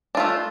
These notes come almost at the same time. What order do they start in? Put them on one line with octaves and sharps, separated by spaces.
D4 F4 A3